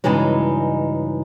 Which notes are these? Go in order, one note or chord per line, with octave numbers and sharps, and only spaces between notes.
G2 C#3 E3 F#3 G#3 D#4